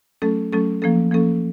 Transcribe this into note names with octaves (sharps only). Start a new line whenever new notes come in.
F#3 A3 C#4 A4
F#3 A3 C#4 A4
F3 A#3 C#4 A4
F3 A#3 C#4 A4